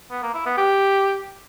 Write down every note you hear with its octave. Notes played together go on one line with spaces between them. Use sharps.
B3
A#3
E4
B3
G4